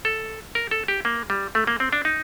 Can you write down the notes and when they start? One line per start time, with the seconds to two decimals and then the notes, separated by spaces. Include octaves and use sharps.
0.05 A4
0.55 A#4
0.71 A4
0.88 G4
1.05 A#3
1.30 G3
1.55 A3
1.67 A#3
1.80 C4
1.93 D4
2.05 D#4